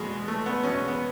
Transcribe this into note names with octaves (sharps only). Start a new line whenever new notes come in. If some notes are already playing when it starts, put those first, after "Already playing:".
Already playing: E2 B2 G#3 B3
A3
B3
E2 B2 C#4
B3